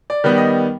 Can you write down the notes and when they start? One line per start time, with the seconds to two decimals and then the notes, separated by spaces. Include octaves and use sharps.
0.10 D5
0.24 D#3 G3 B3
0.38 D#5